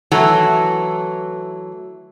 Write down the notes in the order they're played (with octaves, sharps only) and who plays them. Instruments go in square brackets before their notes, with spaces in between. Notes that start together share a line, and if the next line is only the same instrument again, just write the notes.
[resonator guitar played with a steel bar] E3 F#3 A3